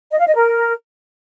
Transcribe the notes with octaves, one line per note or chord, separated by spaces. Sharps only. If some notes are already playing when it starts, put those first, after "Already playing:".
D#5
F5
D#5
A#4